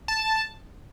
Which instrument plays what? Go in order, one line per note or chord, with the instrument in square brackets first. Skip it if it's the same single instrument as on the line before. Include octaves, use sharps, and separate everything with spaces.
[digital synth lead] A5